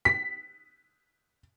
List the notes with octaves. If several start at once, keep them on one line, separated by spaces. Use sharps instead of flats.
B6